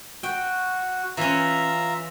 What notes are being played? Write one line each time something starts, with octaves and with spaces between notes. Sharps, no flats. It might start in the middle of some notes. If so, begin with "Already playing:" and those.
F#4 G5
E3 C#4 F4 E5 A#5